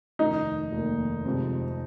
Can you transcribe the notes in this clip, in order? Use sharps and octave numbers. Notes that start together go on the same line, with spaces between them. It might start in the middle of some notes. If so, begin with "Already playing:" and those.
F1 D#2 D#3 A#3 D#4
F1 D#2 D#3 A#3
F2 C3 G#3 C4